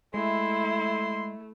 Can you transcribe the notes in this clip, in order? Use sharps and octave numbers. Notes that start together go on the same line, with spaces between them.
G#3 A3 E4 C6